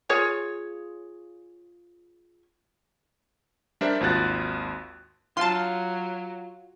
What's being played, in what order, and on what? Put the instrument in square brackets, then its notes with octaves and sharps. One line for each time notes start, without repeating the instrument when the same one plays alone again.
[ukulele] F4 G#4 C#5
[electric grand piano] G3 D4 A#4 C5 D5 E5
G#1 D#2 F4 F#4 F#6 A6
[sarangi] F#3 [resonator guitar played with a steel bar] F4 [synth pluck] A5 C6